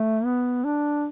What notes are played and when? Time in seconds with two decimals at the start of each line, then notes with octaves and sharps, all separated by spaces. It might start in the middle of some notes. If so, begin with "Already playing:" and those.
Already playing: A3
0.25 B3
0.64 D4